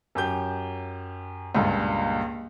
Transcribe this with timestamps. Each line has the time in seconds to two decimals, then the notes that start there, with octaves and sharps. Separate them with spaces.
0.15 F#2 G4 G6
1.55 C#2 G2 A#2